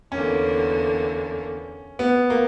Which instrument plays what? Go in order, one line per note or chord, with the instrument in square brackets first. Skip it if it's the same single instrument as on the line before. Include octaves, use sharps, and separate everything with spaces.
[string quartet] E2 D3 A#3 [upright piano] C#4
[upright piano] B3
A#3